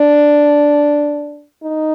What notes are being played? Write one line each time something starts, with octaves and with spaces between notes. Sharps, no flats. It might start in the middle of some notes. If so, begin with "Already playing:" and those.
Already playing: D4
D#4